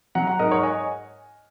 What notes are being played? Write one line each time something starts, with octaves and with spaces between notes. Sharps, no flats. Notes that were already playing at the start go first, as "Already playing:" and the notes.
F#3 F#5 A#5
F#5 A#5
G#2 A#4 D#5
C#5 F#5
D#5 G#5